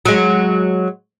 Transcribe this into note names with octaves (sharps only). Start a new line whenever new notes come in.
F#3 G#3